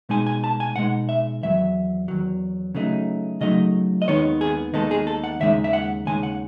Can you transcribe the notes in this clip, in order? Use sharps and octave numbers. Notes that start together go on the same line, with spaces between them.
B2 G#3 D#4 G#5
G#5
A5
G#5
B2 G#3 D#4 F#5
E5
E2 D#3 F#3 E5
E2 D#3 F#3
C#3 F#3 A3 D#4
C#3 F#3 A3 D#4 D#5
D#5
D#2 D#3 G#3 B3 D#4 C#5
G#4
D#2 D#3 G#3 B3 D#4 A4
G#4
A4
F#5
D#2 C#3 G#3 D#4 E5
E5
F#5
D#2 C#3 G#3 D#4 G#5
F#5